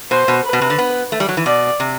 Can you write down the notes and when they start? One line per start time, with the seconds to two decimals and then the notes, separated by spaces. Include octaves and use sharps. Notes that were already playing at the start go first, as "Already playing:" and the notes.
0.10 B2 C5
0.28 B2
0.45 B4
0.53 B2
0.61 C3
0.70 D3
0.78 B3
1.12 A3
1.20 G3
1.29 F#3
1.37 E3
1.46 B2 D5
1.80 C3